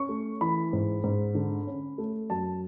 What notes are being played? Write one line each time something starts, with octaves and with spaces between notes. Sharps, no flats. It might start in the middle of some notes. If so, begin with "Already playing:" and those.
Already playing: C#4 C#6
A3
E3 B5
G#2
G#2
D3
C#4
A3
F#2 A5